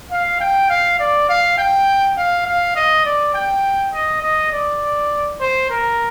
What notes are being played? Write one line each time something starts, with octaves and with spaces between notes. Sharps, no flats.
F5
G5
F5
D5
F5
G5
F5
F5
D#5
D5
G5
D#5
D#5
D5
C5
A#4